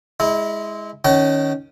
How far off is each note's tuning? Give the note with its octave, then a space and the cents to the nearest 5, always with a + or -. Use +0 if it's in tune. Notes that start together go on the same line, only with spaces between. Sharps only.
G#3 +0 E4 -25
D#3 +0 C#4 +0 F#5 +45